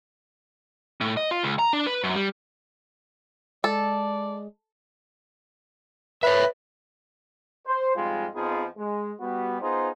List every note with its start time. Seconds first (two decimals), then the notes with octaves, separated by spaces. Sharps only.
1.01 A2
1.17 D#5
1.31 F4
1.43 C#2
1.59 A#5
1.73 D4
1.87 B4
2.04 F#2
2.16 G3
3.64 G#3 A4 D5
6.23 B4 C#5 E5
7.66 C5
7.96 F2 G#2 G3 G#3 F4
8.34 F2 F3 B3 D#4 F4 G#4
8.77 G#3
9.20 G3 B3 F#4
9.61 B3 D#4 F4 G#4 C5